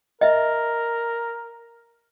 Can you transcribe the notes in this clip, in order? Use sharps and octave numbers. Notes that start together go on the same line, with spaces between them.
A#4 D#5 E5